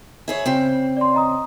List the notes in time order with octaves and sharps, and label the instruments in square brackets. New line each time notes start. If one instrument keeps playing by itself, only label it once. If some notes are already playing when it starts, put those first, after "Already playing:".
[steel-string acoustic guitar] E4 G#4 C#5
C#3 C4
[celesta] D5 C6
D#5 A#5 D#6